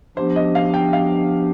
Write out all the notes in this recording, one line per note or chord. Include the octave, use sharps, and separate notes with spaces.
F3 B3 D4 G4 C5
D#5
F5
G5
F5